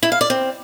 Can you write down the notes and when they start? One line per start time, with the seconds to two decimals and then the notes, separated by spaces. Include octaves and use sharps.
0.03 E4
0.12 F5
0.21 D5
0.30 C4